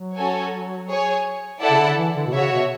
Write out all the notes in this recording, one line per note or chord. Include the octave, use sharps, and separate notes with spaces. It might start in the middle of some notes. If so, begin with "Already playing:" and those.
Already playing: F#3
C#4 F#4 A4 C#5 G#5
G#4 C#5 G#5
E4 A4 D5 F#5 A5
C#3
D3
E3
D3
B2
C#3 F#4 C#5 E5
B2